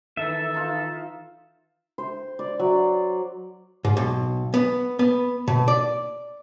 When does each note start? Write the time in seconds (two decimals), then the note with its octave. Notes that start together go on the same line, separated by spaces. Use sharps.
0.17 D#3 E3 A4 E5
0.54 D#4 F4
1.98 C5
2.39 D5
2.59 F#3
3.85 G#2
3.97 B1
4.54 B3
4.99 B3
5.48 B2
5.68 D5